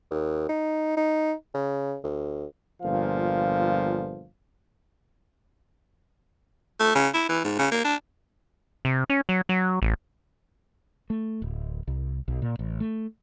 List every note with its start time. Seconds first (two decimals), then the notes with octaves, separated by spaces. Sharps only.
0.11 D#2
0.49 D#4
0.97 D#4
1.54 C#3
2.04 D2
2.82 G1 A#2 F3 F5
6.80 A3
6.95 C#3
7.14 E4
7.29 E3
7.44 G#2
7.59 C#3
7.72 A#3
7.84 D4
8.85 C3
9.10 C#4
9.29 F#3
9.49 F#3
9.82 A1
11.10 A3
11.42 D1
11.88 C2
12.28 B1
12.42 A#2
12.59 A1
12.80 A3